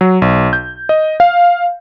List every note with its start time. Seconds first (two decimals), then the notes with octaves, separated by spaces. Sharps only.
0.01 F#3
0.22 B1
0.53 G6
0.89 D#5
1.20 F5